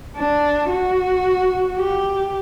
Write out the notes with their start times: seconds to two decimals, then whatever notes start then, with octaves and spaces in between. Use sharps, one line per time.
0.17 D4
0.71 F#4
1.78 G4